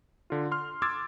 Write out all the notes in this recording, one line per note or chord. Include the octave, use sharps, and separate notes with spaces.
D3 F4
C6 F6
C6 D6 E6 G#6 A6